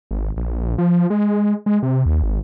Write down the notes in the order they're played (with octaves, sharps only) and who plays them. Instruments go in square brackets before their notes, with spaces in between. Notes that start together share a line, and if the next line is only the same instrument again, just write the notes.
[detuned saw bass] G#1
A#1
A#1
F3
G#3
G#3
C3
D#2
G#1